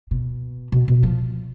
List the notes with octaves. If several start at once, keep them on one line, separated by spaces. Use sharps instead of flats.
B2
B2
B2
F3